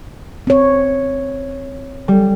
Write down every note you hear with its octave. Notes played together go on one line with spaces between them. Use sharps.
C4 C#5
G3